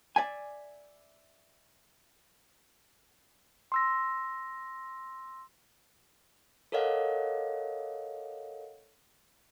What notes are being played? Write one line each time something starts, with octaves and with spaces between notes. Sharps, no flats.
D5 E5 G#5
C6 E6 A#6
A4 A#4 C#5 D#5 F5 F#5